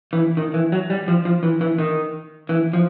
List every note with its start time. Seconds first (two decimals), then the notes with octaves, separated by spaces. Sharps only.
0.13 E3
0.37 D#3
0.54 E3
0.72 F#3
0.90 G3
1.08 F3
1.25 F3
1.43 E3
1.61 E3
1.78 D#3
2.49 E3
2.73 F3